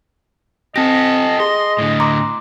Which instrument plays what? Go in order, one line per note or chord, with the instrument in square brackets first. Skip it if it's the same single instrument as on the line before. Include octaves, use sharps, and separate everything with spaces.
[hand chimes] C4 A#6 [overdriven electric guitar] G4 A4 [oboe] D#5
[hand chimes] G#4 [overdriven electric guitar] C6
[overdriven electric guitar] A2 D3
[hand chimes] A#5 C6 D6